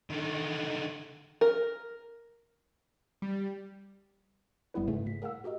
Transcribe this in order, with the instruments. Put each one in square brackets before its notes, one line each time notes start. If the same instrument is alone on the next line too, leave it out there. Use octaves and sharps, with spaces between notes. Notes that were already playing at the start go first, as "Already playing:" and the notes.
[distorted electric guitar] D3 D#3
[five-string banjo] A#4
[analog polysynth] G3
[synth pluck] G1 G2 G3 B3 E4 B4
G#2 C#3 A3 G#4
A#2 B6
G#4 A#4 F5 F#5 E6
F#4 G4 A#4 D#5